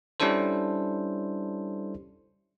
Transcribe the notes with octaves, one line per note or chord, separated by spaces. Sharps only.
G3 C#4 D4 E4 A4 C5